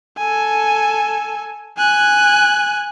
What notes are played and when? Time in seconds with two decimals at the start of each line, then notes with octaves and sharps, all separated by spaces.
0.17 A4 G#5
1.78 G#5 F#6